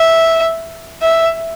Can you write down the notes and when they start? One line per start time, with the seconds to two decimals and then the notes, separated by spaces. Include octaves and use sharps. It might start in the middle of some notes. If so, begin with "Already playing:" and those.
Already playing: E5
1.02 E5